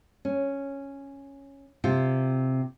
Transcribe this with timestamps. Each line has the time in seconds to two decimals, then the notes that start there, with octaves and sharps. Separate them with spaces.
0.25 C#4
1.84 C3 F4